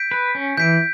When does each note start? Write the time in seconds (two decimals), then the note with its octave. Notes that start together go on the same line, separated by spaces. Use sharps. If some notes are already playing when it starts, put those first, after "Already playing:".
Already playing: G6 B6 D7
0.11 B4
0.35 C#4
0.58 E3 G6 B6 D7